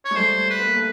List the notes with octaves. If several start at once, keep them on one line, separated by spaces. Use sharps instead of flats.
C#5
G#3
G3 A3 C5
B4
B3
A#3
A3